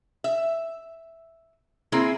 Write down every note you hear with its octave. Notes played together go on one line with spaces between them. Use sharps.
E5
A#3 C4 E4 G#4